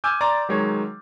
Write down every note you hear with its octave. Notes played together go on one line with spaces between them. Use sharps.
G#5 D6 E6 F6 G6
D5 A#5 C6 D6 A6
D#3 F#3 G#3 C#5